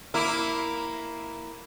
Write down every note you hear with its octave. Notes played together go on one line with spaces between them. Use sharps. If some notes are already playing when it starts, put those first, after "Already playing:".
A#3 E4